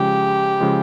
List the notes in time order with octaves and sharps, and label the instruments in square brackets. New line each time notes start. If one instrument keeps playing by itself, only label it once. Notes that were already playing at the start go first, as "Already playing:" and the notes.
Already playing: [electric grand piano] C#3 F3 G#3 [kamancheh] G4
[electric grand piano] C#3 F3 G#3